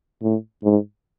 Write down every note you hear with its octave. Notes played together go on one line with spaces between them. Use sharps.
A2
G#2